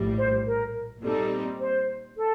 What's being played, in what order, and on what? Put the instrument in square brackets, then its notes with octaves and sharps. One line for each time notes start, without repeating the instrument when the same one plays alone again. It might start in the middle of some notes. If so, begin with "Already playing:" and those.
Already playing: [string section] A#1 A2 G3
[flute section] C5
A#4
[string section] A#2 G3 C4 D#4 [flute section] A4
[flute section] C5
A4